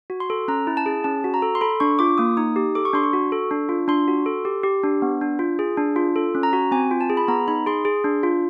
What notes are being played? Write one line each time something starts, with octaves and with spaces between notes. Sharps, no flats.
F#4
C6
A4
C#4 A#5
E4
A5
G#4
C#4 A5
F#4
A#5
A4
C6
A4 B5
D4 C#6
F4 D6
A#3 D#6
D#4 D#6
G4
A4 D6
C#6
D4 C6
C#6
F#4
A4
D4
F4
D4 C6
F#4
A4
G4
G4
D4
B3
D4
F4
G#4
D4
F4
A4
C#4
A#5
F#4
C4 G#5
F4
A5
G#4
B5
B3 A#5
D#4 B5
G#4 C6
G#4
D4
F4